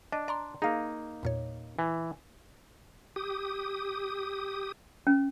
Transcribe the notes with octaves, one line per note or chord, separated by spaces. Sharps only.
D4 D#5
D5 A#5 C6
A#3 D#4 G#4 F5
E2 A#2 C#5
E3
G4 D#6
C#4